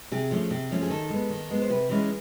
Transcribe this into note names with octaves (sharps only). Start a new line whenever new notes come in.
C3 G#4
F3 A3 C#4
C3
F3 A3 C#4
G#4
D#3 A4
G#3 B3
D#3
G#3 B3
C5
C3 B4
E3 G#3 C#4